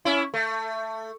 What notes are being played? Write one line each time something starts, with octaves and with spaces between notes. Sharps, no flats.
C#4 E4
A3